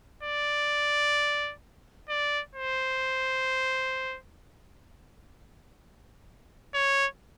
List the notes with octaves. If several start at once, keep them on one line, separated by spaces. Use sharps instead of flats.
D5
D5
C5
C#5